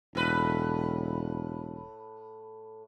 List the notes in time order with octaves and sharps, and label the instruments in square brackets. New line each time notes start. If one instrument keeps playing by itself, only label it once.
[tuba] E1 [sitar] A2 B4